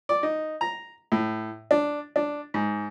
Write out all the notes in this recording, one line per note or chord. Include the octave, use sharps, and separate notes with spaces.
D5
D#4
A#5
A2
D4
D4
G#2